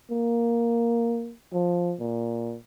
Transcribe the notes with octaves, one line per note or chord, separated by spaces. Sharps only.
A#3
F3
A#2